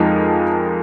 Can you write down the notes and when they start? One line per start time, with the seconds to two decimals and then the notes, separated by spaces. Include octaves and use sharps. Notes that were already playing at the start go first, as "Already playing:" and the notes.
Already playing: F2 F3 G#3 D#4 A#4